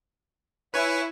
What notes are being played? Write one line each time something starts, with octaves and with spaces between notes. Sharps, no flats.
E4 B4 C#5 G#5